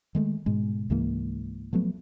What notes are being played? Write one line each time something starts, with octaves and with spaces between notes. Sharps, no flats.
D#3 G#3 A3
G#2 B2 G#3
C#2 G#2 E3 A#3
F3 F#3 A3 B3